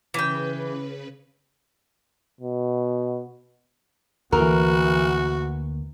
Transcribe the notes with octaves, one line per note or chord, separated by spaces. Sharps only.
C#3 E3 B4 G5
B2
D2 E3 A#3 F#4 A#4